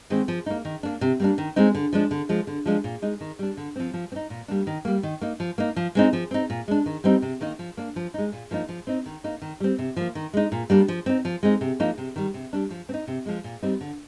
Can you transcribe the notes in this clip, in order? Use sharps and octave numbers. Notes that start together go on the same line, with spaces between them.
D#3 G#3 C4
F3
A#3 D#4
D#3
A#3 D4
C3
G3 A#3 D4
D#3
G#3 C4 D#4
D3
F3 G#3 D4
D3
F3 G#3
D3
F3 G#3 D4
A#2
G#3 D#4
D#3
G3 D4
D3
F3 C4
F3
C4
D#4
A#2
G3 A#3 D4
D#3
G3 A#3
D#3
A#3 D#4
F3
A#3 D#4
F3
G#3 C4 D#4
F3
C4 D#4
A#2
G#3 D4
D#3
G3 C4 D#4
C3
D#3 A#3 D#4
F3
A#3 D4
F3
G#3 D#4
A#2
F3 A#3 D#4
F3
C4 D#4
D#3
A#3 D#4
D#3
G3 C4
C3
F3 A#3
D#3
G#3 D#4
A#2
G3 A#3 D4
F3
C4 D#4
F3
G#3 C4 D#4
C3
F3 A#3 D#4
C3
D#3 G3
C3
G3 D4
F3
C4
D#4
C3
F3 G#3
A#2
G3 C4 D#4
D3